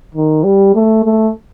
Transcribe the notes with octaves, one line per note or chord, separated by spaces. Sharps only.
D#3
G3
A3
A3